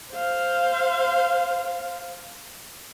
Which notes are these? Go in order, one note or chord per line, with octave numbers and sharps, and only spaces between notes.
C5 F5